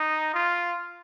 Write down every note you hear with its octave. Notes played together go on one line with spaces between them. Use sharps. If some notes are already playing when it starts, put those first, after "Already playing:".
Already playing: D#4
F4